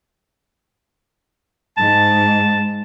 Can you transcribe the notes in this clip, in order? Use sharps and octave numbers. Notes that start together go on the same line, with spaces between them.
G#2 A5